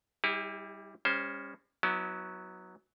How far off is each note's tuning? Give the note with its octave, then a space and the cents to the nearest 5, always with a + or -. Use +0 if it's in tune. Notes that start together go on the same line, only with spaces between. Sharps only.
G3 +0 E4 -40 G#4 -45
G3 +40 C#4 +0 C5 +0
F#3 +0 B3 -15 E4 -40